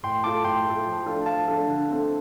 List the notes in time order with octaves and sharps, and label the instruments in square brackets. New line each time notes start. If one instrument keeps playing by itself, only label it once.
[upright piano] A2 [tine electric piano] G5 C6
[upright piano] A3 F4 A4 [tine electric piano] A5 D6
[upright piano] A2 [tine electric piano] G5 C6
[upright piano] A3 F4 A4
F3
A3 D4 F4 A4
[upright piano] F3 [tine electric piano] F5 A5
[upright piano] A3 D4 F4 A4
D3
A3 C4 A4